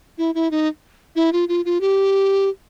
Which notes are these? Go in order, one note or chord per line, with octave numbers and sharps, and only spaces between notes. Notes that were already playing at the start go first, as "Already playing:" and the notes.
E4
E4
D#4
E4
F4
F4
F4
G4